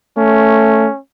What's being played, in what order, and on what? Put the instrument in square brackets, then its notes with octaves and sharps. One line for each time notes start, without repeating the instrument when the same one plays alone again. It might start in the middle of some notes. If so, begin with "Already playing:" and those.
[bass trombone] A3 [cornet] C#4